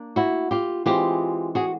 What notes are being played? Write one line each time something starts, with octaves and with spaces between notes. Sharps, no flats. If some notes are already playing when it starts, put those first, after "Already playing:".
Already playing: A#3 D4
E4 F#4
F4 G4
E3 G#3 C4 F4 G4
F#4 G#4